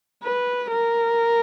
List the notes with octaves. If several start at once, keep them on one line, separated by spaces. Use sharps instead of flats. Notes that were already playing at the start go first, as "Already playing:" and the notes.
B4
A#4